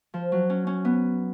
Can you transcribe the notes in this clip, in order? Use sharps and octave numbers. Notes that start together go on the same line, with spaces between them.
F3
F#3
C#4
C#4
B3